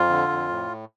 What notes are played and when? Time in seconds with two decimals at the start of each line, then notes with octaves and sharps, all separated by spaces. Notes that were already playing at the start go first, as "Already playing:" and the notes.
Already playing: F2 F4
0.09 D3
0.29 F2
0.49 A2